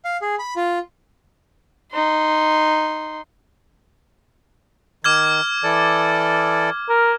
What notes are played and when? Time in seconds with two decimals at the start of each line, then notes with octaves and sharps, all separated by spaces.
0.05 F5
0.22 G#4
0.39 B5
0.56 F4
1.92 D#4 C6
5.04 D#3 D6 F6 G#6
5.64 E3 A4 D5
6.89 A#4